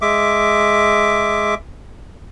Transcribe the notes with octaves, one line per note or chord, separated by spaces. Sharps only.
G#3 E5 D6